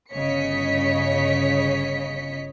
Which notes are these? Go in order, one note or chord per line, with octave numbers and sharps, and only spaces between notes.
G1 C#3 C#5 D#5 B6 C#7